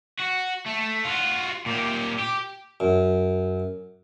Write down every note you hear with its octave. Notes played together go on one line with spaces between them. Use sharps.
F#4
A3
F4 F#4
A#2 G4
G4
F#2